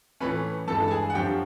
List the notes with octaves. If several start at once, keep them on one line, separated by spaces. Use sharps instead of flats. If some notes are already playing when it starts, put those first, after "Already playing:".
A2 E3 A3 C#4 B4 B5
G2 E3 G#3 A4 A5
A5
G#4 G#5
F#5
F#2 D3 F3 G4 G5